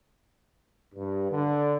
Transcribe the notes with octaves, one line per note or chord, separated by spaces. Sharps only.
G2
D3